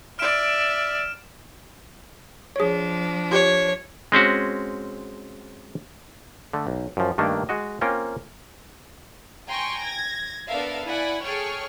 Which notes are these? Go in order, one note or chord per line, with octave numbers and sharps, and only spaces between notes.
D5 E5 F6 D7 E7
F3 D4 G#4 C#5
F4 G4 C#5
G#3 C4 C#4 F#4
D3 A3
B1
F#2 F3
G2 D#3 A3 A#3 D4
G#3 F#4 D#5
A#3 C4 C#4 F4 A#4 G5
G5 G#5 A#5 C6 C#6
G#6 A#6
B3 D4 A4 A#4 E5 F5
E4 D5 F#5 G#5 B5
G#4 A4 C#5 G5 C#6 F6